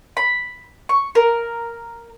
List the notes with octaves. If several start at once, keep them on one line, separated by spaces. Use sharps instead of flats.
B5
C#6
A#4